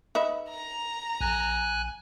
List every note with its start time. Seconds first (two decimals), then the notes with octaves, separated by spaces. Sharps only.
0.15 D#4 B4 E5
0.49 A#5
1.21 A#1 G#5 F#6